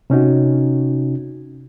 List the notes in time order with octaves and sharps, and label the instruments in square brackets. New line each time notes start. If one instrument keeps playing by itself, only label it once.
[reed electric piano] C3 C#4 D#4 F#4